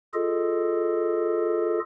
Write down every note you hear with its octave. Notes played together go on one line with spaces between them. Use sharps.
F4 G#4 A4 D#5